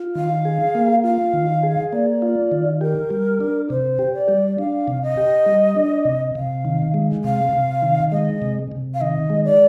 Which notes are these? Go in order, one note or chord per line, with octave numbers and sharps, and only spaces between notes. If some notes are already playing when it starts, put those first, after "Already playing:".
Already playing: F4
D#3 F5
G#4
A#3
F4 F5
D#3
G#4
A#3 D5
F4
D#3
G4 A#4
G3
D4
C3 C5
G4
D5
G3
D4 F5
C3
D#5
G4
G3
D4
C3
C3 F5
D#3
G#3
C3 F5
C3
D#3
G#3 D#5
C3
C3
F5
D#3 D#5
G#3
D5